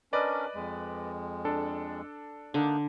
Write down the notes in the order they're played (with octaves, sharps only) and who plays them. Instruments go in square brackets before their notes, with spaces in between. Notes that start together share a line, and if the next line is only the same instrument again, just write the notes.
[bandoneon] C#4 D4 A#4 [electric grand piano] B4 D5 D#5
[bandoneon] F2 G#3
[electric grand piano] D4 A4
[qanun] D3 [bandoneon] A#3 D4 D#4